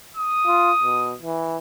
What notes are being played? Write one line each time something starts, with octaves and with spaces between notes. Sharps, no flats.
D#6
F4
B2
E3